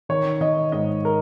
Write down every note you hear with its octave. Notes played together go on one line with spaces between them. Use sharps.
D#3 C#5
D#3 D#5
G#2 D#5
A#4